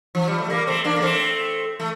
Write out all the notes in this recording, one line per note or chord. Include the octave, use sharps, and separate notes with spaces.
F3
G3
A3
G3 A#3
A3 C4
A#3 D4
A#3
A3 C4
A3